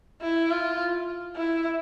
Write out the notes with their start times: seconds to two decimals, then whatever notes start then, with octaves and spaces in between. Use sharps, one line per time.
0.22 E4
0.51 F4
1.36 E4